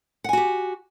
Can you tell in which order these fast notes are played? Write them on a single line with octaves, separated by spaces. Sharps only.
F#5 G#5 F#4 G4